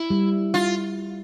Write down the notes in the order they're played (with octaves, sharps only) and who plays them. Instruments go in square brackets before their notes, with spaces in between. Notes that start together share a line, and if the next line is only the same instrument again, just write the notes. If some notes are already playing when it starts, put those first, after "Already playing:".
Already playing: [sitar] E4
[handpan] G3
[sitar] F4